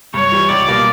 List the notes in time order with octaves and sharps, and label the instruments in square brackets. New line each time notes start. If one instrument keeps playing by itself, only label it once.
[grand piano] G2 [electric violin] C#5
[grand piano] E3 G3
[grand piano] C#2 [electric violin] D5
[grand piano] B2 G3 A#3